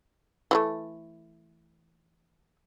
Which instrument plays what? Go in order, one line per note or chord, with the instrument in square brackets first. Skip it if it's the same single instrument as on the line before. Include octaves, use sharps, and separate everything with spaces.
[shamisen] E3 G3 A3